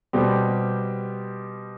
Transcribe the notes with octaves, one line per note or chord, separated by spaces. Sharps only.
B2 G3 C4 G4